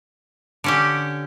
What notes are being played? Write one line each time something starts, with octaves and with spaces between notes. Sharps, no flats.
D3 C#4 G4